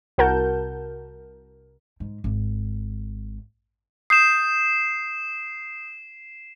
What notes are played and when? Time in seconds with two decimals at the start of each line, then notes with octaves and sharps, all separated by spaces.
0.18 C2 F#4 A#4 F#5 A5 G6
2.00 G#2
2.24 G#1
4.10 D#6 G6 C7 E7